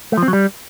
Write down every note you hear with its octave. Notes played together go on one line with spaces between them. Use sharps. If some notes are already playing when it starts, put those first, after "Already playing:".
A3
F3
C4
F#3
G3